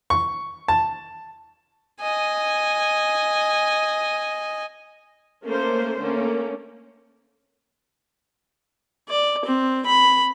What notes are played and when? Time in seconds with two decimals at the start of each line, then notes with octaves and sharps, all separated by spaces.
0.10 C#6
0.68 A5
2.01 D#5 G#5
5.44 A3 A#3 C#4 A#4 C5
6.00 D3 A3 A#3 C#4
9.09 D5
9.45 C4
9.86 B5